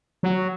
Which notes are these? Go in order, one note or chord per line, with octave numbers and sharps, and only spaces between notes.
F#3